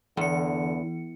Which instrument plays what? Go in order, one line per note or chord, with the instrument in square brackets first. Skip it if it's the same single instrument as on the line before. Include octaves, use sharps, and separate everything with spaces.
[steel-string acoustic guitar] E2 [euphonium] D3 [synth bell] E3 C#7